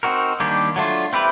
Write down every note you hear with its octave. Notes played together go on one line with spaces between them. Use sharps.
C4 D#4 F#4 A#4
D#3 G3 A#3 D4 G4
F#3 A3 D4 F4
C4 E4 G4 B4